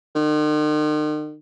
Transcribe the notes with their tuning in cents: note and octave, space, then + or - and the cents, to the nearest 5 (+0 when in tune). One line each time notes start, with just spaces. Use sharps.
D#3 -45